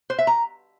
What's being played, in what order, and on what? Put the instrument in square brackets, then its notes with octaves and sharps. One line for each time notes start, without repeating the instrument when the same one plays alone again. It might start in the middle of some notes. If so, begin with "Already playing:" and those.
[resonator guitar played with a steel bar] C5
E5
A#5